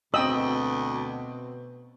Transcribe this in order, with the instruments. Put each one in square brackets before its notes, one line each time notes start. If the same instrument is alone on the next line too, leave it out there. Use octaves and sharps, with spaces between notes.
[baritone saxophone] D2 [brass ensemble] B2 [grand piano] C4 G5 F#7 [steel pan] D#5 D#6 E6